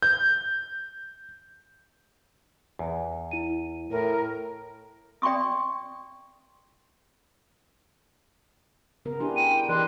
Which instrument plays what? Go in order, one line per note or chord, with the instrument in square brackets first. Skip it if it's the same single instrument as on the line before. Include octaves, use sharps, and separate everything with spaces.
[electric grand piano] G6
[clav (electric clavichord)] E2
[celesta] E4 D#7
[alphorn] A2 [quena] A#4
[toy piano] D5 G5 C6 C#6 D#6
[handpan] C#3 B3 A#4
[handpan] D4 E4 G4 [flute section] G#5 C6
[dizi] G5 [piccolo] D#7
[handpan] E3 A#4 D5 [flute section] G4 D#5 C6 [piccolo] F#6